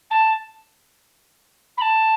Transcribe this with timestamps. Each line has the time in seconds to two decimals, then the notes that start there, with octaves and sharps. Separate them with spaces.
0.10 A5
1.77 B5
1.81 A5